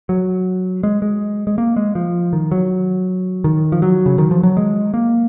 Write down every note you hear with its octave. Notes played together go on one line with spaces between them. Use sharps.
F#3
G#3
G#3
G#3
A#3
G#3
F3
D#3
F#3
D#3
F3
F#3
C#3
D#3
F3
F#3
G#3
A#3